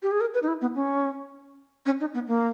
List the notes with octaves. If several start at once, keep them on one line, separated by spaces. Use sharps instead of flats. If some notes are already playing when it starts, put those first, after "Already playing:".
G4
G#4
A#4
B4
D#4
E4
B3
C#4
C#4
D#4
B3
A#3